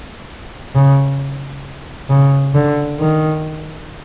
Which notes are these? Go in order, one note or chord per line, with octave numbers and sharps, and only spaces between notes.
C#3
C#3
D3
D#3